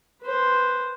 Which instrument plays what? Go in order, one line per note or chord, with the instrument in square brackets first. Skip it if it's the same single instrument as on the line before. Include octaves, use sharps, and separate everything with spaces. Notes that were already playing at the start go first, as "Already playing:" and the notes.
[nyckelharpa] B4 C5